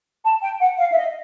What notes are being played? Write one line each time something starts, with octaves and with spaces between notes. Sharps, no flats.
A5
G5
F#5
F5
E5
D#5